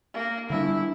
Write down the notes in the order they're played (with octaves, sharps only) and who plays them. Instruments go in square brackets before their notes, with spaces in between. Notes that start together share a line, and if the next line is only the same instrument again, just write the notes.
[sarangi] A#3
[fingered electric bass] D3 G3 D4 [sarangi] E4